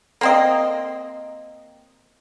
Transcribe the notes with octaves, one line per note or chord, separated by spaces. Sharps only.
A#3 C4 D#5